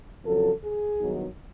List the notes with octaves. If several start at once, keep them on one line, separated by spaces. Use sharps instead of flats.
F2 C#3 F#3 A4
G#4
G2 D#3 F#3 B3 D#4